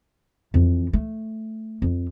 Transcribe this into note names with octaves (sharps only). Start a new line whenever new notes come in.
F2 E3
A3
F2